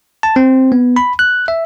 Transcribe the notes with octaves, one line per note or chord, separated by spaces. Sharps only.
A5
C4
B3
B5
F#6
E5